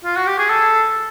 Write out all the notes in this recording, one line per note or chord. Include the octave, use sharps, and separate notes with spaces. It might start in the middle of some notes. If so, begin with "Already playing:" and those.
F4
F#4
G4
G#4
A4